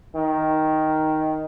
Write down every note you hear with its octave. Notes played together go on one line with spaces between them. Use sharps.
D#3